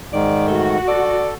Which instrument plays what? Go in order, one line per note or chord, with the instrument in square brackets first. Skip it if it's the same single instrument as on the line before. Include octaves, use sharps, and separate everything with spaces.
[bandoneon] G#2 D#3 [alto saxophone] D5
[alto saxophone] A3 [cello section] F#4
[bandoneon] A4 [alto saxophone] D5